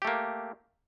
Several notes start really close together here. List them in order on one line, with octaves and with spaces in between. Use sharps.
G4 A3 A#3